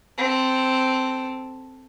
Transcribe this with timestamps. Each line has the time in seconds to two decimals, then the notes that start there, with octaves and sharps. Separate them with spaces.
0.18 C4 A4